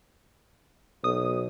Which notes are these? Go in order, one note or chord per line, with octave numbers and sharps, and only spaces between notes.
B1 D#6